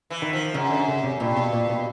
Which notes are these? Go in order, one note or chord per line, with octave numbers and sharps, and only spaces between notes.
E3
D#3
F3
F#2 C#3
D3
C#3
C3
G2 A#2
B2
A#2
B2